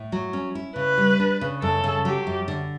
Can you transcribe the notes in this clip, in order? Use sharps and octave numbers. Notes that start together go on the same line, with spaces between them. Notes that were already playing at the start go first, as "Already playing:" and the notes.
Already playing: A2
F#3
C#4
E4
C#3 B4
G3
D4
C#3
F#2 A4
C#3
F#3 G4
F#2
D3